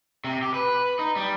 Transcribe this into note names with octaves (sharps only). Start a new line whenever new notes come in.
C3
G4
B4
D#4
G3